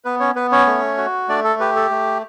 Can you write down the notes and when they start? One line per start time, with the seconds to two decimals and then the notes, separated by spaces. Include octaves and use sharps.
0.05 B3 B4
0.20 C#4 C#5
0.35 B3 B4
0.52 C#4 C#5
0.66 A3
0.97 F#4
1.28 A3 D4 D5
1.44 A4
1.60 G4 B4
1.76 A4
1.90 A3